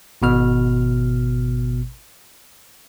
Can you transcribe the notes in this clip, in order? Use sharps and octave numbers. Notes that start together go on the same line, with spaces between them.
G#1 B2 F6